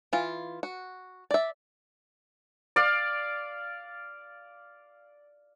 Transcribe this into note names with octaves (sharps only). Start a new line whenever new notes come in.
E3 F4
F#4
D5 E5
D5 F5